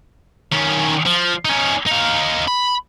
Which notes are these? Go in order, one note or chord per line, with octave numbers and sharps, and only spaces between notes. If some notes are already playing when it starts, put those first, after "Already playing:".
D#3 C#4
F3
C#4 D#4
D#4 F5
B5